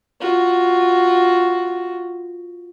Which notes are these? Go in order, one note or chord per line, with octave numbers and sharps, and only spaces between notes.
F4 F#4